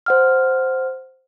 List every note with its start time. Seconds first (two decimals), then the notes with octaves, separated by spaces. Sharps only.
0.06 C5 F#5 F6